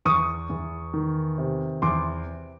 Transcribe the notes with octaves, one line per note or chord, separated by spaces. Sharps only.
E2 C#6 D#6
E2
D#3
C3
E2 C6 D6